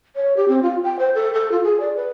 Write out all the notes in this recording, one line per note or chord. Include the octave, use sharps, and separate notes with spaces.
C#5
G4
C4
F4
G5
C5
A4
A4
F4
G#4
D5
B4